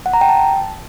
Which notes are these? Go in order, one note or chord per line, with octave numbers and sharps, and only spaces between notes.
F#5
A#5
G5
A5